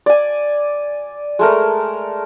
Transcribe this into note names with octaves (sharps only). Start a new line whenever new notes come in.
D5 G#5
G#3 A3 A#4